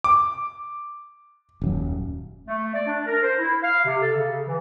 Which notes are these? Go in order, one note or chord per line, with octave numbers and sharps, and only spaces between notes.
D6
D#1 F#2
A3
D5
D4
A#4
C5
E4
F5
C3
A4
C#3
E3